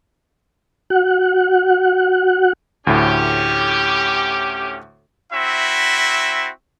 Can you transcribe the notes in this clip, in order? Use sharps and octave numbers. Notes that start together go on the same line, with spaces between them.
F#4 F#5
D2 A2 C#4 G4
C4 E4 F#4 E5